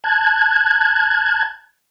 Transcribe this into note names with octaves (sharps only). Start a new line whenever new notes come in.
A5 F#6 G#6